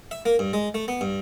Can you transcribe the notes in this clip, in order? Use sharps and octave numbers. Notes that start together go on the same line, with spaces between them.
E5
A#3
G2
G#3
A3
B3
G2